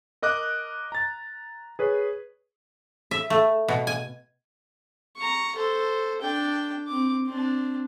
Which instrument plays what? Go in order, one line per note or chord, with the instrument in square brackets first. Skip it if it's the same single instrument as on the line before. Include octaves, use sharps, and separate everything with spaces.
[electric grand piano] A#4 D#5 D6 F#6
A#5 A6
G#4 B4 C#5
[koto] E5
A3
B2
G#5
[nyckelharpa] A#5 C#6
A4 C5
D4 G5
C4 D6
C4 D4